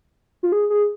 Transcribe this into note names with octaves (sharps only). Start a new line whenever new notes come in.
F4
G#4
G#4